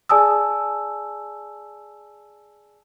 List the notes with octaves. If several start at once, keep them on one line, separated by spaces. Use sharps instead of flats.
G#4 D5 G#5 A5 D#6 E6